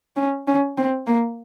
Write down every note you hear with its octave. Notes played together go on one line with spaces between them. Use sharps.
C#4
C#4
C4
A#3